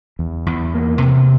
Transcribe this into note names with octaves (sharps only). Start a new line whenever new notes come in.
E2
E2
A#3
C3